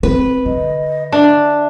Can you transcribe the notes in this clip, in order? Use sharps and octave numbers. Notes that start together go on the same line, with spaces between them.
C4 B4
D3 D#5
D4 E5